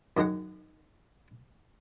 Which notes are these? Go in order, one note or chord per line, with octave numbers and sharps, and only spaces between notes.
F#2 D#3 G#3 F#5